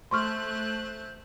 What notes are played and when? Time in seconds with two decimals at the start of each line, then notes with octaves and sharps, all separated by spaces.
0.11 A3 C5 C6 C#6 F6 F#6